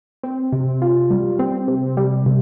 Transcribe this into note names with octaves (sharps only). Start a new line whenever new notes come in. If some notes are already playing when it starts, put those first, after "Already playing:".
C4
C3
F4
G3
C4
C3
G3
C3